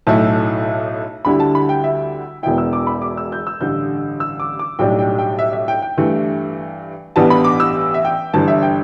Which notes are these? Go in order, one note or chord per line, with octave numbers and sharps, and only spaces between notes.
B1 A2 A3 E4 A5
D2 D3 G3 E4 B5
A5
B5
G5
E5
E1 E2 B2 B3 E4 G5
E6
D6
B5
D6
E6
G6
E6
A1 G2 D3 G6
E6
D6
D6
B1 A2 G3 D4 G5
G5
G5
E5
E5
G5
G5
G2 E3 A3
A1 G2 E3 G3 B3 A5
B5
D6
E6
E5
G5
G1 G2 E3 A5
E5
G5